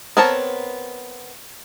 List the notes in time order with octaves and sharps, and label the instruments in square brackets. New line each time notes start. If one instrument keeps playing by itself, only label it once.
[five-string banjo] B3 C4 A#4 C#5 A5